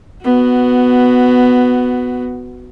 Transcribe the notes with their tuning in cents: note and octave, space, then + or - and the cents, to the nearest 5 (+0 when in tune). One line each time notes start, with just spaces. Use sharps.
B3 +10 F#4 +0